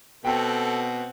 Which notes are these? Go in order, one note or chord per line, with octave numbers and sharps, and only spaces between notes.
B2 C4 A4 F#5 G5